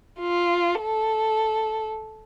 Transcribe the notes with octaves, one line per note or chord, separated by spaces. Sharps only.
F4
A4